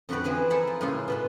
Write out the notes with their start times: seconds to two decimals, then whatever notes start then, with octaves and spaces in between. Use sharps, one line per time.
0.09 F2 D3 F#4 G4 B4 D5
0.24 E3 F3 E4 G#4 B4 D#5
0.50 D#4 E4 A4 A#4 E5
0.67 F4
0.81 A2 C#3 G#3 A#3 F4
1.08 B2 B4 C6